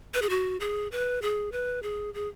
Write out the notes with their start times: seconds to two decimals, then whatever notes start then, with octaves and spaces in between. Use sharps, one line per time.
0.14 B4
0.22 G#4
0.29 F#4
0.60 G#4
0.92 B4
1.22 G#4
1.52 B4
1.83 G#4
2.14 G#4